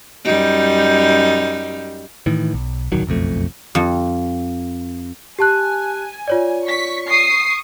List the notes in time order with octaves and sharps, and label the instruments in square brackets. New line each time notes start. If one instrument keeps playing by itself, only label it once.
[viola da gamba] F#2 G3 D#4
[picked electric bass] A2 D#3 E3
B1
D1 C2 D#3 F#3
F#1 B1 F2 A3
[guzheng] F2
[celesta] G4 A5 F#6 [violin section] G#5
[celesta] F4 C#5 D5
[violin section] C#6 B6
C#6 D#6 C7